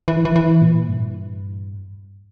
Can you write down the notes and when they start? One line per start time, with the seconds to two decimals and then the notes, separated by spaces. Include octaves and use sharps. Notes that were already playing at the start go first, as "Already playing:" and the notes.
0.08 E3
0.25 E3
0.36 E3
0.62 A#2
0.89 G2